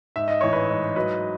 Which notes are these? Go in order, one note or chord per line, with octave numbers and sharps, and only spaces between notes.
G#2 E5
D#5
A1 C#5
B4 D#5
G#2
F#3 B4 D#5